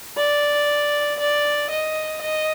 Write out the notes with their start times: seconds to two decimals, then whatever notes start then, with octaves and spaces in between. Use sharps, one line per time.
0.17 D5
1.20 D5
1.70 D#5
2.22 D#5